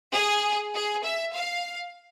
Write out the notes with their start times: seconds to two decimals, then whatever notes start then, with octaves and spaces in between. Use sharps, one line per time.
0.14 G#4
0.74 G#4
1.04 E5
1.34 F5